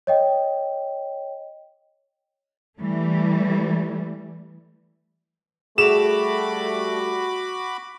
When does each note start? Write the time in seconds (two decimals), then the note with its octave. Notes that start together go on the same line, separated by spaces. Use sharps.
0.07 C#5 D#5 G5
2.79 E3 G3 A3
5.78 G3 A3 F#4 G#4 B5 D6 E7 F7